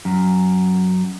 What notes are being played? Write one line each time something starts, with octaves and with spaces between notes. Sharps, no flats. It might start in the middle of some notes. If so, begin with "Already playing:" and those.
F#2